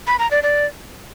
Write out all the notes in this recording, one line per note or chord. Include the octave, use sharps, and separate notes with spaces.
B5
A#5
D5
D5